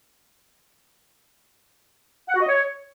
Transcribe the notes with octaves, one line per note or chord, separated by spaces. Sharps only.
F#5
F#4
D#5
C#5